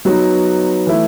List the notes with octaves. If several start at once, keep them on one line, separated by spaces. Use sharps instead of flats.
F#3 B3 D#4 F#4 B4
E3 A3 E4